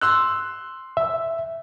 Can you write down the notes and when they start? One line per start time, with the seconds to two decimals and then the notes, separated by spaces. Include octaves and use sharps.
0.01 C6 E6 F#6
0.97 E5